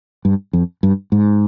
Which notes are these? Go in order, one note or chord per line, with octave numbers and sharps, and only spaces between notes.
G2
F2
G2
G#2